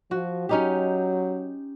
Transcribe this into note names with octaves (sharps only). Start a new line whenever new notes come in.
F3 F#4
F#3 C#4 D#4 G4